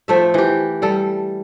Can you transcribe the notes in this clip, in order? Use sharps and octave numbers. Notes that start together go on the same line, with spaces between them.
F3 A3 E5
E3 G4
G3 A4